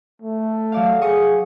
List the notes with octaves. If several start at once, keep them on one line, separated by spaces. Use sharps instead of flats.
A3
F#3 D5 F5
G#4 C#6 D#6